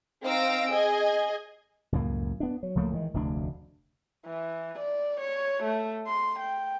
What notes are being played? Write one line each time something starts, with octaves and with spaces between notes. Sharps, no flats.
C4 D#4 F5 E6 A#6 D7
G#4 D#5 G#6
C#2 F#2 A2 A#3
B3 D4
F#3
C#2 F3 A3 A#3
D#3 E3 F#3 G#3
F1 D2 D4
E3
D5
C#5
A3
C6
G5